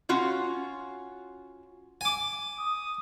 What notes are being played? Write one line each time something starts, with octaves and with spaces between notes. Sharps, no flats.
C#4 F4 F#4
G#5 D6
D#6